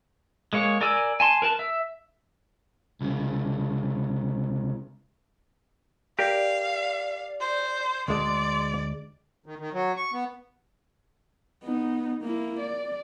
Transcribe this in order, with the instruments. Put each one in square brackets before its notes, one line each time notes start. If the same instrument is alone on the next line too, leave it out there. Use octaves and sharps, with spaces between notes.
[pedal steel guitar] G#3 A#3 C#5
A#4 D5 G#5 E6
G#5 A5 C6
A#4 B4 A5
E5
[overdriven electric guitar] C2 C#3
[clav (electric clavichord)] G4 A#4 [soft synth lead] D5 [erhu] F5
[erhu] C5
[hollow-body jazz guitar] D2 G#3 [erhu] D5 [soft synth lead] C6
[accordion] D#3
D#3
F#3
C#6
B3
[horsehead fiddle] B3 D#4
A#3 E4
D5